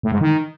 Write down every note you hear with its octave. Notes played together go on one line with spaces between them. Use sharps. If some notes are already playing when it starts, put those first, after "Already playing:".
A2
G#2
D#3